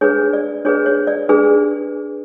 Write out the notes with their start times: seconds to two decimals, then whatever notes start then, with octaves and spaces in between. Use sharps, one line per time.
0.01 D4 G#4 B4 C#5
0.33 D5
0.65 D4 G#4 B4 C#5
0.86 C#5
1.07 D5
1.29 D4 G#4 B4